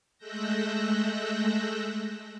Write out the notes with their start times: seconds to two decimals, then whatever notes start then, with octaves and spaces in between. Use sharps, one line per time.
0.18 G#3 A3 E6 F#6 G6 A#6